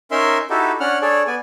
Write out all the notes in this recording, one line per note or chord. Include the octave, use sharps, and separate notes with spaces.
C#4 D#4 A#4 E5 C6
D#4 E4 F#4 G4 A4
C#4 D4 F#5 F6
D4 G#4 A4 C#5 D5
B3 D5 G#5